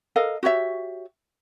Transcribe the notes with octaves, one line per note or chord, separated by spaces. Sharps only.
A4 A#4 D#5 F5
F#4 G4 C#5 E5